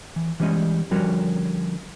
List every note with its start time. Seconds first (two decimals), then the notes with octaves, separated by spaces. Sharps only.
0.16 E3
0.40 E3 G3 G#3 C#4 D#5
0.91 D3 F3 G3 C#4 F#4 A#4